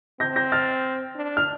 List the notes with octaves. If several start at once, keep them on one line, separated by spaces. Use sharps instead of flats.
C4 G6 A#6
G6 A#6
F6 A6
D4
F6